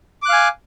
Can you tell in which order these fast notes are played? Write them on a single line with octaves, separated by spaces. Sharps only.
D6 F#6 F5 G#5